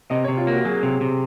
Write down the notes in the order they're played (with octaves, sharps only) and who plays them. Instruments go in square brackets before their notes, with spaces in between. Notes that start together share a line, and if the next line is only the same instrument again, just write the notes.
[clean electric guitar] C3 [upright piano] D#5
[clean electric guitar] C3 [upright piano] C#5
[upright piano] F4
[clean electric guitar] A#3 [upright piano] F#4
[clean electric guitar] F#3 [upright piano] G#4
[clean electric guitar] C3
C3